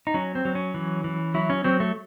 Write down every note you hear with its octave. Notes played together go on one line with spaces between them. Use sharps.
D#4
F#3 C#4
C4
F#3
C#4
E3
E3
F#3 E4
C#4
F#3 C4
A3